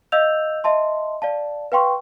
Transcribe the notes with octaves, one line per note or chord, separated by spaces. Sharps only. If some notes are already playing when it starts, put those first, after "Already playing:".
D#5 F5 E6 G6 F7
D#5 E5 A5 C6
D5 F5 A5
B4 F5 G5 C6 C#6